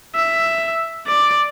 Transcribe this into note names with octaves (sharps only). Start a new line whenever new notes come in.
E5
D5